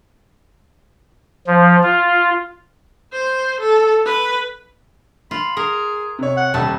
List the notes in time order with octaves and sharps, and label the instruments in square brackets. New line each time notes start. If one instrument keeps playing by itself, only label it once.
[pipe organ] F3
F4
[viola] C5
A4
B4
[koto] F4 [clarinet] B5
[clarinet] G#4 [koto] A#4
[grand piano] C3 C#5
[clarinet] F#5
[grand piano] D#1 [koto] G3 A3 B4 [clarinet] A5